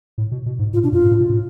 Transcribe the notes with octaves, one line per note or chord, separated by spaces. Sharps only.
A2
B2
B2
G#2
A2 F4
B2 D4
F#2 F4
G#2
A2
B2
A2